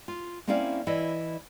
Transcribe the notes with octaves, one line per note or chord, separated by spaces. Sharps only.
F4
A#3 C4 C#4 E4 D5 F5
E3 E4 D5 D#5